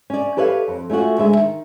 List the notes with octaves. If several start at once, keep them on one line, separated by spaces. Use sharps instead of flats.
C#4 D5
G4 A4 B4 C#5 E5 F5
F2
A3 C#4 F4 F#4
D2 G#3 E5
D#3